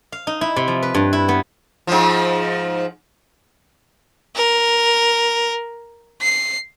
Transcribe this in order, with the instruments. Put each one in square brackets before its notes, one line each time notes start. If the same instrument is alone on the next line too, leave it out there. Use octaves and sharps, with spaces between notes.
[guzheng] F5
D#4
E4
C3
F3
B4
G2
E4
B3
[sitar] G#2 F3
[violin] A#4
C7